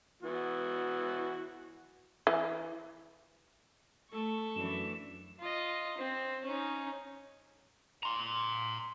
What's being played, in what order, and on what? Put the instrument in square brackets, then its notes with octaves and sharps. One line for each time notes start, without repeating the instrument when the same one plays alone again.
[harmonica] E3 B3 F#4
[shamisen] E3
[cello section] A3 [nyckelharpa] A4 C#6
[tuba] F#2 [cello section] E3 A3 D4 [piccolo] E7
[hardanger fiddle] F4 D#5
C4
C#4 D#4
[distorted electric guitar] A#5 C6